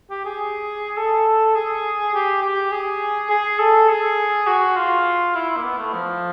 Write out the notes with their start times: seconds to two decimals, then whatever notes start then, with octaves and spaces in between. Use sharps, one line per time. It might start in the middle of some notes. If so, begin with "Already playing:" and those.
0.10 G4
0.25 G#4
0.97 A4
1.56 G#4
2.14 G4
2.42 G4
2.72 G#4
3.30 G#4
3.59 A4
3.89 G#4
4.47 F#4
4.76 F4
5.35 E4
5.57 A#3
5.63 B3
5.78 A3
5.93 F3